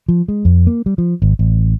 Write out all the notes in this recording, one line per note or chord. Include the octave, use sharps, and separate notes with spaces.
F3
G#3
F2
A#3
G3
F3
G#1
A1